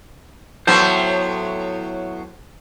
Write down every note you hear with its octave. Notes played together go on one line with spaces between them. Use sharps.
A2 F#3 B3 C5 A5